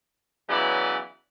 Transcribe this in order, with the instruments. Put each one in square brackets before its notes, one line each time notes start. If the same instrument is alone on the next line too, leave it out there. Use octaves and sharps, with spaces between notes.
[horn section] C#3 E3 F#3 B3 E4 D5